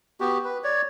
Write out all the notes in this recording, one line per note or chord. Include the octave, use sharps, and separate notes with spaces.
B3 F#4 G4
B4
C#5 D5